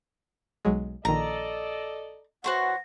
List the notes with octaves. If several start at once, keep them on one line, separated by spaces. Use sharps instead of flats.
B1 F#3 G#3
A#1 D#3 A4 D5 D#5 A#5
E3 F#4 C5 C#5 F#5